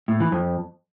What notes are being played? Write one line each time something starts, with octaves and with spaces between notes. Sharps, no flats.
A2
E3
F2